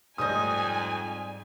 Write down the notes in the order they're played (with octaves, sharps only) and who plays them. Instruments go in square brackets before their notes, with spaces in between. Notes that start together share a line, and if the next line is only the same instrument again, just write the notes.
[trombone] F2 [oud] G#2 G3 D#5 [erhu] G#5 [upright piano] D#6 G6